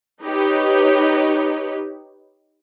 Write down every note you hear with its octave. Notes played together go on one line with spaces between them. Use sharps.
D#4 G4 B4 C#5